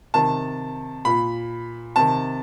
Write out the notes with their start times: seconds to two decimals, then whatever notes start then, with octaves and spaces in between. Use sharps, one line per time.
0.14 C3 D#3 A5
1.05 A#2 B5
1.96 C3 D#3 A5